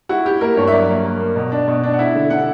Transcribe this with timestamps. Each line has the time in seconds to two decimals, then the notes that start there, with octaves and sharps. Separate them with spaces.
0.09 E4 F#4
0.25 E4 G4
0.41 A#3 A#4
0.57 G2 C#5
0.67 E5
0.72 F#3 D5
0.88 A#3
1.04 A#3
1.20 A#3
1.36 B2
1.52 D4
1.68 B2
1.83 D4
1.94 F#5
1.99 E4 E5
2.15 D3
2.30 D3 F#5